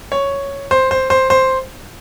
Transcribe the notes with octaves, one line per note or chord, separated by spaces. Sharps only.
C#5
C5
C5
C5
C5